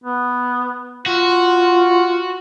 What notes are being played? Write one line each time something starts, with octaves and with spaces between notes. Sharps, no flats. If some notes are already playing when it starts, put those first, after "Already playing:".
B3
F4 F#4